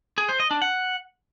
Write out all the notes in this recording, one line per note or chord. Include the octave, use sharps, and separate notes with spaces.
G#4
C5
D#5
D4
F#5